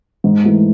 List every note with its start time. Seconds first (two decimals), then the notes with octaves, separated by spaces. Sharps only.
0.24 G#2
0.44 E3 A3